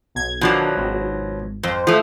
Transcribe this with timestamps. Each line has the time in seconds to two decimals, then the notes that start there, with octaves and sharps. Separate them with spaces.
0.15 B1 G#6
0.41 B2 D#3 F3 F#3 D4
0.77 G#1
1.63 F2 C5
1.87 F3 A3